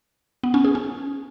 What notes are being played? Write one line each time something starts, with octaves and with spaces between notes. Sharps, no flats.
B3
C#4
G#4
C#4